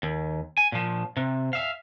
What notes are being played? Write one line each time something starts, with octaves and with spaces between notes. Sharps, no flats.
D#2
G#5
A#2 F3
C3
E5 F5